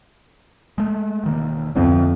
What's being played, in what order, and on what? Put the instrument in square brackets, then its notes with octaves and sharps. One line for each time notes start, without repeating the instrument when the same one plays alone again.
[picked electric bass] G#3 A3
E1 D#3 A#3
[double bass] F2 [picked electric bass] D3 B3 C4